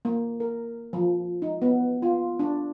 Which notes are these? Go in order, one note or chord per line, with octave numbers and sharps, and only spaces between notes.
A#3
A#4
F3
D#4
B3
F4
D4